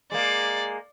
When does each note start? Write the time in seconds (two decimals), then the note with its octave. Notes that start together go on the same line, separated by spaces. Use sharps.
0.12 G#3 A#3 D5